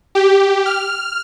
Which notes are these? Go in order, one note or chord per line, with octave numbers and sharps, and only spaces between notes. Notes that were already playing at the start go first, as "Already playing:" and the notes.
G4
F6